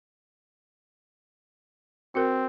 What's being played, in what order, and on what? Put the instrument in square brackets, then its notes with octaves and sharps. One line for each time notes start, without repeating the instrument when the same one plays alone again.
[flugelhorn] C4 [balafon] F#4 A#4